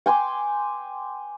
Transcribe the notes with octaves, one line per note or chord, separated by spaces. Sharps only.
G5 G#5 C6 D6